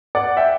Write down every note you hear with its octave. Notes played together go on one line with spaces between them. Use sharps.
D5 F#5
E5 G5